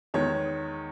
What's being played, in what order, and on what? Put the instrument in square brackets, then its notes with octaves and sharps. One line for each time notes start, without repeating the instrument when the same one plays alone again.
[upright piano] E2 D#3 G#3 C#5